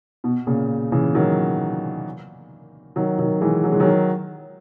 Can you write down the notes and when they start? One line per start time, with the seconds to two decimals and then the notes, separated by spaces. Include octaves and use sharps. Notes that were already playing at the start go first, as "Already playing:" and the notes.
0.24 B2
0.47 A#2 C#3
0.92 C#3 E3
1.15 D#3 F#3
2.96 D#3 F#3
3.19 D#3 F#3
3.41 E3 G#3
3.64 F#3
3.72 G#3
3.80 D#3 F#3